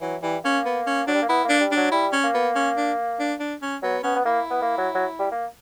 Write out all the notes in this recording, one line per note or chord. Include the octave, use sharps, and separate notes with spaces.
E3 F#3
E3 G3
A#3 C#4
B3
C#4
F#3 D4
G3
A#3
B3 E4
A#3 D4
G3
F#3 D4
G3 E4
C#4
A#3
B3
C#4
D4
D4
D4
C#4
F#3 B3
B3 C#4
B3
A#3 E4
B3
A#3
F#3
F#3
G3
A#3